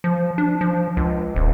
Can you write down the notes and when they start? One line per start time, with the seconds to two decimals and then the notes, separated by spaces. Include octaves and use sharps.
0.04 F3
0.38 D4
0.61 F3
0.97 C#2
1.36 D#1